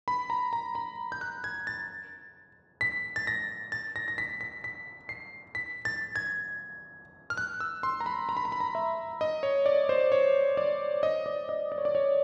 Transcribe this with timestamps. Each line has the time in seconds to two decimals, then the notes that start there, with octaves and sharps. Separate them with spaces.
0.08 B5
0.30 A#5
0.53 A#5
0.75 B5
1.12 G6
1.21 F#6
1.44 G#6
1.67 A6
2.81 B6
3.16 A6
3.27 A#6
3.72 A6
3.96 A#6
4.08 A#6
4.18 B6
4.41 B6
4.64 B6
5.09 C7
5.55 B6
5.85 A6
6.16 G#6
7.30 F6
7.37 F#6
7.60 E6
7.83 C6
8.00 A#5
8.06 B5
8.29 A#5
8.37 B5
8.45 A#5
8.52 B5
8.60 A#5
8.75 E5
9.21 D#5
9.43 C#5
9.66 D5
9.89 C5
10.12 C#5
10.57 D5
11.03 D#5
11.26 D5
11.49 D#5
11.72 D5
11.78 C#5
11.85 D5
11.95 C#5